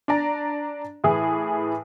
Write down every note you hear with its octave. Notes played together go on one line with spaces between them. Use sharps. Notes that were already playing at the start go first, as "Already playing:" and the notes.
D4 D5 A#5
A2 E3 G#4